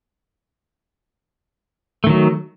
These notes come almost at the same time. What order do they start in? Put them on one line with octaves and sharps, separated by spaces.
A3 D#3 F#3